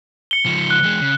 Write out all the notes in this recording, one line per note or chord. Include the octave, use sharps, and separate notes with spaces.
C#7 G7
C#2 F3
F#6
E2 G#3
C#3